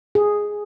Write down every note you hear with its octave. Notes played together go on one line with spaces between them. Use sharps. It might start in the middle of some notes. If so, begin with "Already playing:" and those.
G#4